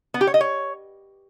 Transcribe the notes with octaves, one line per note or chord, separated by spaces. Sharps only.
B3
G4
C#5
D#5
C#5